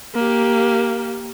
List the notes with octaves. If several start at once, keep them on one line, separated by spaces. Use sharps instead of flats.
A#3 G4